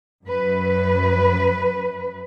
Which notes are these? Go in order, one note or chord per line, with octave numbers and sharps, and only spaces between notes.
F#2 B4